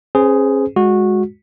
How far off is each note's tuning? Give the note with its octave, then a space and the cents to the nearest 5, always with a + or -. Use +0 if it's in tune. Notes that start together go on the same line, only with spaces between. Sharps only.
C#4 -40 G#4 +0 C5 -35
G#3 -5 F#4 -15